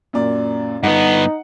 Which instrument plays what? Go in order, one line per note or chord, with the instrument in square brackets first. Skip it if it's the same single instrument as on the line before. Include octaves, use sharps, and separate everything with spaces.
[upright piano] F#2 A#2 D5
[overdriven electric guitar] G2 B3 [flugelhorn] D#4 [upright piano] F#5